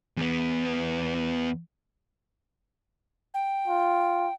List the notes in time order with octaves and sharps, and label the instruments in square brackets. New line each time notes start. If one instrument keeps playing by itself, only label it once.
[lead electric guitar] E2 B3
[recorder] G5
[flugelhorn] F4